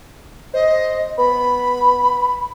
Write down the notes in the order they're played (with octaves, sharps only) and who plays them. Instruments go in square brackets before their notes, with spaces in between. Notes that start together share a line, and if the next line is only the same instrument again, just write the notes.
[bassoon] C5 [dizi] D#5
[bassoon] B3 [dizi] B5